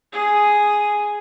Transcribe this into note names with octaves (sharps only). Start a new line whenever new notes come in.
G#4 D#6